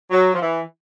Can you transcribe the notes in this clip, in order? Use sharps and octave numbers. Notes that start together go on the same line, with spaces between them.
F#3
F3
E3